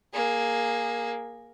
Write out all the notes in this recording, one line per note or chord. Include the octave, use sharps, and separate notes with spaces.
A#3 G#4